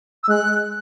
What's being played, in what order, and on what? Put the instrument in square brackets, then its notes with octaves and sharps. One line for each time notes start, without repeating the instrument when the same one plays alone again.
[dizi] E6
[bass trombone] G#3 [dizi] F#6